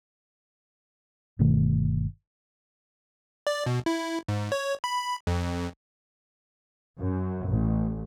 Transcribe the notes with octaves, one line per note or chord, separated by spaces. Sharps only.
G1 B2 D#3 A3
D5
B2
E4
G#2
C#5
B5
F2
F#2
A1